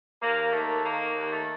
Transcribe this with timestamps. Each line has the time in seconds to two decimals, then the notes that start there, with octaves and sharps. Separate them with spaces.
0.21 D#2 A#3
0.52 D#3 A3
0.84 D#3 A#3
1.15 D#2
1.31 A3